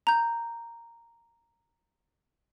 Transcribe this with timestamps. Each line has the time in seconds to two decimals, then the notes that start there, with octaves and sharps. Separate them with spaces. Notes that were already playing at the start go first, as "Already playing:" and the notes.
0.07 A#5 G6